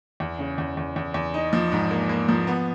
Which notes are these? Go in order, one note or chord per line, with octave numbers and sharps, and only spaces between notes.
E2
C#3
E2
E2
E2
E2
D#4
F3
G#2
A#3
A#3
F3
B3